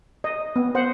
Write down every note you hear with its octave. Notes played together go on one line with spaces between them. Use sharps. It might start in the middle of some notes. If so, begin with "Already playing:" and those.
D#5
B3
C5 F#5